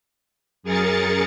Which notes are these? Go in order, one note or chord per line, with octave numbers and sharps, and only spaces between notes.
F#2 G#4 A#4 A6 C#7